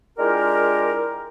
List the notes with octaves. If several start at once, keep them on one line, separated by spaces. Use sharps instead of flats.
G#3 D4 E4 F4 G4 A#4